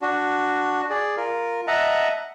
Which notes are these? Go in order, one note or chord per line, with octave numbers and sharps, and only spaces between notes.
D4 F#4
G#4 D5
F4 A#4
D#5 E5 F#5 A5 A#5